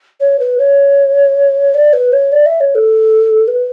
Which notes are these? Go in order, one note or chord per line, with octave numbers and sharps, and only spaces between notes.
C#5
B4
C#5
D5
B4
C#5
D5
E5
C#5
A4
B4